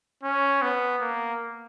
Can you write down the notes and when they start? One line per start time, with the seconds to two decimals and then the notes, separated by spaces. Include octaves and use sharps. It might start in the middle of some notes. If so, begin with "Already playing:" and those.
0.23 C#4
0.62 B3
1.01 A#3